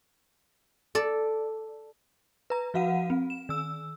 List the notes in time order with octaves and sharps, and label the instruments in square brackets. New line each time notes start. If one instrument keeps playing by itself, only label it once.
[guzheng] A4 D5
[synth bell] B4 A#5
F3 F#4 F5 F#5 D#7
C4
E7
D#3 E6